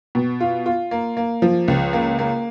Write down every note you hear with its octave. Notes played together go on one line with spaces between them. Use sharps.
B2
F4
F4
A#3
A#3
F3
C#2
A#3
A#3